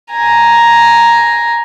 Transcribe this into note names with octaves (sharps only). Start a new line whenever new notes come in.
G#5 A#5